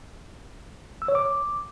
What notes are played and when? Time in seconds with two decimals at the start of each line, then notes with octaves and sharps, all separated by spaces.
1.02 E6
1.08 C#5
1.15 D6